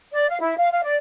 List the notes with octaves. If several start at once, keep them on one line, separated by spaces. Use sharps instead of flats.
D5
F5
E4
F5
F5
D5